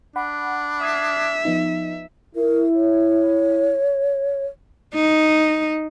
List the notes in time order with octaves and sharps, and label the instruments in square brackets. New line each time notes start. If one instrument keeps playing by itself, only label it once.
[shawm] D4 [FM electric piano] F#5 B5
[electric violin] E5 [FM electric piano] D#6 G#6 C7
[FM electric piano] F3 B3 D#4
[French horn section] E4 [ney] A#4
[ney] C#5
[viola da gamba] D#4